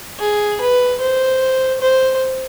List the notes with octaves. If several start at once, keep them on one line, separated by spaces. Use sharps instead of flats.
G#4
B4
C5
C5